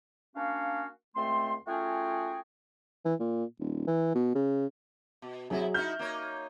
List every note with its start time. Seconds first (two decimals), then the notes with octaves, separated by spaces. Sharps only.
0.35 A#3 C#4 D4 F#4 F5
1.16 C#2 A3 C4 C6
1.67 A3 C#4 F4 F#4 G#4 G5
3.05 E3
3.20 A#2
3.60 D#1
3.87 E3
4.15 B2
4.35 C#3
5.22 B2
5.50 C3 F#3 E4 G#4 D#5
5.74 D#4 E4 F#4 F6 G6
5.99 A#3 D#4 C#5